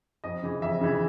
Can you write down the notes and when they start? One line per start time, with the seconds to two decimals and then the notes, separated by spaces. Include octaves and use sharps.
0.24 F2 D#5
0.43 C#3 E3
0.62 F2 E5
0.81 C#3 E3